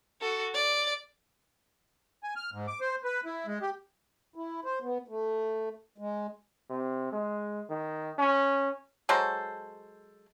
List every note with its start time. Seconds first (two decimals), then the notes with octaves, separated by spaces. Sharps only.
0.21 F#4 A4
0.54 D5
2.23 G#5
2.36 F6
2.53 G#2
2.68 D6
2.81 C5
3.04 B4
3.25 E4
3.46 G#3
3.62 G4
4.35 E4
4.64 C5
4.82 B3
5.08 A3
5.98 G#3
6.70 C3
7.12 G#3
7.69 D#3
8.18 C#4
9.09 F#3 G#3 A4 C5